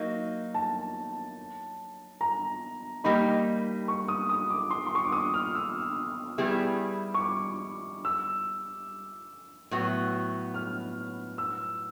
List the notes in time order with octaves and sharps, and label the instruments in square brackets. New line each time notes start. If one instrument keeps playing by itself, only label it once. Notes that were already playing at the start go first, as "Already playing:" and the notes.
Already playing: [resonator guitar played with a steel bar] F#3 A#3 D#4
[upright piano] A5
A#5
[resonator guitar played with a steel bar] G3 A#3 D#4 [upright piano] B5
[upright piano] C#6
D#6
D#6
D6
C6
C6
C#6
D6
D#6
F6
E6
[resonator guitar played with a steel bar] G3 B3 E4 G#4
[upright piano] C#6
D6
E6
[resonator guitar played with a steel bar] A2 F#3 B3
[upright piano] F6
E6